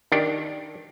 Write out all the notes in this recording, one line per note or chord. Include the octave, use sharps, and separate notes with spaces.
D#3 D4 G4